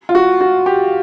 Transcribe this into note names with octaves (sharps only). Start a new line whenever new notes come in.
F4
F#4
F#4
G4